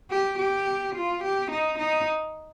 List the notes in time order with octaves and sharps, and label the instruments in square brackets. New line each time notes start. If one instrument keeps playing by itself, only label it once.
[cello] G4
G4
F4
G4
D#4
D#4